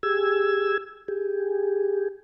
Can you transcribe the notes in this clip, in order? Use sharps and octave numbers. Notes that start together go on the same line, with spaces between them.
G4 G#4 E6 G#6
G4 G#4